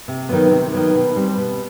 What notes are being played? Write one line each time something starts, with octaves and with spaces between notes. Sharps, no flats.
C3
D#3 F#3 B3
C3
D#3 F#3 B3
B2
G3 C4
B2